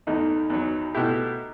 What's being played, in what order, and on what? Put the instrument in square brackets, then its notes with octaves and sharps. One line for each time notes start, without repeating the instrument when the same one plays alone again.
[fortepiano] E2 D#3 A3 [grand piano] D#4
[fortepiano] E2 D#3 F#3
B2 A3 E4 G4